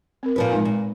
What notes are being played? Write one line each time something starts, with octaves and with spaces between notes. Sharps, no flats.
C4 A#4
A#2 F3 B4
G#3 D#4 G#5
A#2